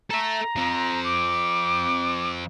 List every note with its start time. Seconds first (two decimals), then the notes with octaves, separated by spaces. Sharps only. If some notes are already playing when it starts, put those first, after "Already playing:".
0.10 A4 E5 A#5
0.56 F3 C4
1.04 D6